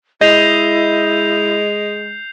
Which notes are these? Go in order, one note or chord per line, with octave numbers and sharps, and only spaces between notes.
G#3 E4 D#5 G6 C7 F7